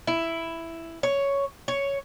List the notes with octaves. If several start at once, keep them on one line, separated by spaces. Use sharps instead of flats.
E4
C#5
C#5